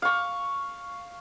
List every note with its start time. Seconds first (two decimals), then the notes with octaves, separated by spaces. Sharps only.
0.02 F5 C#6